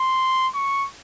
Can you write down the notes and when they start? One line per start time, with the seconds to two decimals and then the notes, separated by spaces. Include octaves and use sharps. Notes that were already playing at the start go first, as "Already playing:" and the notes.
Already playing: C6
0.55 C#6